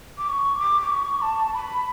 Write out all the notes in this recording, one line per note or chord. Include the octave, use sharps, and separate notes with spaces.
D6
C#6
D6
D6
C#6
A5
A5
B5